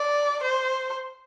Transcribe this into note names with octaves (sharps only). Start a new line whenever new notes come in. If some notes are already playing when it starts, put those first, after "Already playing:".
Already playing: D5
C5